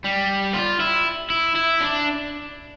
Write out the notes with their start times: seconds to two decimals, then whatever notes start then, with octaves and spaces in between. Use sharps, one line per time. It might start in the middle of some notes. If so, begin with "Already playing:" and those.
0.04 G3
0.54 F4
0.80 E4
1.30 E4
1.55 E4
1.81 D4